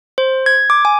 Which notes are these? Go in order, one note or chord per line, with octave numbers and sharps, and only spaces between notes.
C5
G#6
D6
G#5